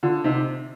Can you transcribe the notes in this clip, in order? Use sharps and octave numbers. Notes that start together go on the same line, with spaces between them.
D3 F4
C3 D#4